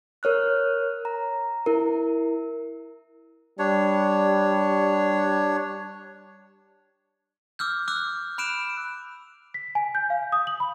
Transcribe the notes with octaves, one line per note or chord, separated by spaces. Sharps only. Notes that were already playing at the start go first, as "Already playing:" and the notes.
A#4 C#5 F6 F#6
A#5
E4 A#4
G3 D4 C#5
D6 E6 F6 G6
D6 E6 F#6
B5 F#6 D7 E7
B6
G#5
G6
F5
D#6
F#7
B5